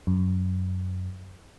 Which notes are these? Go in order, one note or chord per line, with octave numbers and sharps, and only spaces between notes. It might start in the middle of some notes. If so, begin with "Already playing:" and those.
F#2